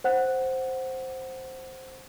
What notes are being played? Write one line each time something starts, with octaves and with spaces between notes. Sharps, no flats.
C5 F#5 F#6